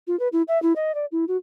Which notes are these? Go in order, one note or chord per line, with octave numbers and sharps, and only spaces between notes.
F4
B4
E4
E5
E4
D#5
D5
E4
F#4